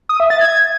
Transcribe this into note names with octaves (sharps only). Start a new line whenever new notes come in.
D#6
E5
A6
G#6